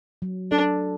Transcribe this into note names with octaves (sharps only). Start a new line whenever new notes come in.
F#3
D4 A4